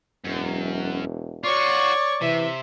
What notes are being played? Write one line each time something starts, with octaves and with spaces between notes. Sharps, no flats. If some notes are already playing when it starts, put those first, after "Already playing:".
E1 F#2
F4 F#4 C#5 D5 C#6
C3 E3 E5